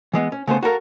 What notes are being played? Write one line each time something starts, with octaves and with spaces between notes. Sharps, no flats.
E3 G#3 B3
C#4
C#3 A3 B3 C5
F#4 A4 A#4 F5